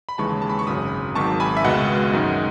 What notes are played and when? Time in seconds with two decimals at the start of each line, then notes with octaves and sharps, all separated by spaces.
0.09 B5
0.18 D#2 C#3 E3 G#3 A5 C#6
0.42 A5
0.50 B5
0.59 C#6
0.67 G#1 F#2 C#3 B5 D#6
1.15 G#1 G#2 D#3 F#3 A5 C#6
1.40 G#5 B5
1.57 E5
1.64 C#2 B2 G#3 D#5 F#5
2.13 F#2 D#3 G#3